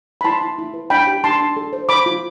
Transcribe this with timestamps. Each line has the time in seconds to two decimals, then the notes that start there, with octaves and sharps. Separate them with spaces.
0.21 B5
0.25 E4 A5 C6
0.42 E4
0.58 E4
0.74 B4
0.90 D4 G5 B5
1.07 G4
1.24 D4 A5 C6
1.41 D4
1.57 A4
1.73 C5
1.89 C5 B5 D6
2.06 F4